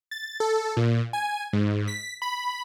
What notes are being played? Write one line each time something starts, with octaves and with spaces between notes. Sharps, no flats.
A6
A4
A#2
G#5
G#2
B6
B5